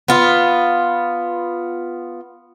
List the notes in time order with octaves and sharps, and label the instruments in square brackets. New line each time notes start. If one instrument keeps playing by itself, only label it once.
[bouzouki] B3 F4